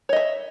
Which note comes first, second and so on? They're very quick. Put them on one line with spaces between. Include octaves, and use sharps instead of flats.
C#5 D#5 E5